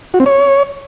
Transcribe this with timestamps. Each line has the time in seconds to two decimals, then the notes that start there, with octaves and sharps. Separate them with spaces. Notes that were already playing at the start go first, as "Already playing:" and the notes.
0.14 F#4
0.20 C4
0.26 C#5